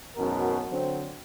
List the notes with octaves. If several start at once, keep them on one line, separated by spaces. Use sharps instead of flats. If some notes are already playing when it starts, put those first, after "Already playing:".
G#1 F#2 B2 F#4 A#4
D3 F#3 C4